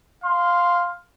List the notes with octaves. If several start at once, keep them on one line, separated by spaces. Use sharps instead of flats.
F5 C6